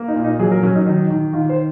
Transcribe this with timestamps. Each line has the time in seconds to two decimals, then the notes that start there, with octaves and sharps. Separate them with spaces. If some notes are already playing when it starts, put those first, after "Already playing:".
Already playing: A#3
0.08 D#4
0.16 A#2
0.24 D#4
0.39 F#3 G#4
0.51 A#4
0.63 F#3 C#4
0.75 D#4
0.86 D#3 D#4
1.10 D#3
1.33 D#3 F4
1.49 C5